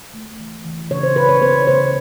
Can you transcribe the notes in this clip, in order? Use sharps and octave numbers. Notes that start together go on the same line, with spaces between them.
A3
E3
E3
C#3 C#5
C5
F#3 B4
C#5
B3 C5
C#3 C5